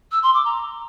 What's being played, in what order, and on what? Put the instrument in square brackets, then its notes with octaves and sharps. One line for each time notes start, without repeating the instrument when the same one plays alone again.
[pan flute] E6
C6
D6
A#5